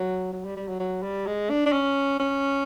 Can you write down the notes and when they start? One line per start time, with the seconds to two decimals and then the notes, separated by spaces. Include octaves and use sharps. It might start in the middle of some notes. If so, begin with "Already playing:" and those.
Already playing: F#3
0.33 F#3
0.45 G3
0.56 G3
0.68 F#3
0.80 F#3
1.02 G3
1.27 G#3
1.50 D4
1.66 D4
1.72 C#4
2.20 C#4